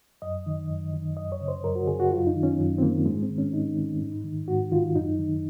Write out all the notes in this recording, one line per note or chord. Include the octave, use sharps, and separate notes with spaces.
F#2 D#5
D#3
F#2
D#3
F#2 D#5
C#5
C#3
C5
F#2 A#4
F#4
C#3 G#4
F#4
F#2 F4
D#4
D#3
C#4
F#2
C4
D#3 A#3
G#2 G#3
C4
D#3
C#4
G#2 D#4
D#3
G#2
D#3
G#2 F#4
D#3 F4
F#2 D#4
D#3